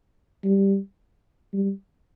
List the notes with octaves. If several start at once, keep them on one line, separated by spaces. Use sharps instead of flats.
G3
G3